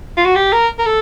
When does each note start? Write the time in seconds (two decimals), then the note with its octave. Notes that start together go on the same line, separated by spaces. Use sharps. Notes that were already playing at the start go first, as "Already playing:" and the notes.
0.17 F4
0.26 F#4
0.36 G4
0.53 A#4
0.78 A#4
0.86 A4